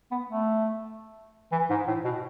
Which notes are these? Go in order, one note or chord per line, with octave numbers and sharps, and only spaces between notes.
B3
A3
E3
G#2
A2
B2